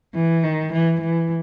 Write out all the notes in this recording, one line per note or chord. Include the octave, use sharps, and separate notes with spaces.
E3
D#3
E3
E3